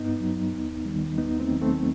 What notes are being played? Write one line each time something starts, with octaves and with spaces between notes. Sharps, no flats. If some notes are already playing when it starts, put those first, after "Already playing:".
Already playing: G2 B3 D#4
F#3
D#2
D#3 G3
D#2 B3 D#4
A3 C4
D#3 F#3
A3 C4